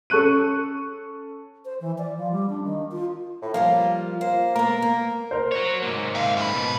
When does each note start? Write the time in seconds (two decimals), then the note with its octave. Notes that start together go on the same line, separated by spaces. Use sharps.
0.10 C#4 A4 C#6 F#6 D#7
1.64 C5
1.80 E3
1.98 D5
2.17 F3
2.31 G3
2.49 D4
2.63 D#3
2.91 F4
3.42 A2
3.54 F3 G3 A#3 F4
4.21 A#3 C5
4.56 A#3 B3 A#4
4.82 A#3
5.31 A#4 C5
5.52 F#4 C#5
5.83 G#2 A#3
6.15 E5 F5
6.37 F#2 B4
6.54 B2